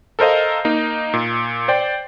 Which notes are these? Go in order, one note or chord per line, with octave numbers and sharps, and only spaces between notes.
A4 A#4 C5 D#5 F5
A#3 D#4
A#2
C5 D5 G5